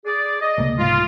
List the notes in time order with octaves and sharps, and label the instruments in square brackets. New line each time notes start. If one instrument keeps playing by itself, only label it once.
[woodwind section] G#4 D5
D#5
[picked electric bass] C#2 C3 A#3
[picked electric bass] C2 G#2 [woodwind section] F4